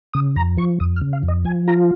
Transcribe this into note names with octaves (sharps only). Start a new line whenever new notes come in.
C#3 D#6
F2 A#5
F3 C#6
F2 D#6
F6
C#3
F5
F2
D#5
F3 G#5
F4 A#5